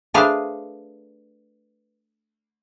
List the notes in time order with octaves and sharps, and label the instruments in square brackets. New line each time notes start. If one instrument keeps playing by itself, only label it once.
[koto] A3 D4 G#4 B4 C5 F5